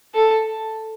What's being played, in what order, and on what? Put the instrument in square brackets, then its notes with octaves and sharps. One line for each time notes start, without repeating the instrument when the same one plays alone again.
[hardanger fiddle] A4